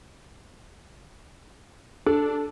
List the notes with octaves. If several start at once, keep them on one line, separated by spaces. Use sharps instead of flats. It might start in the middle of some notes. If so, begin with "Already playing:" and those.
D4 A4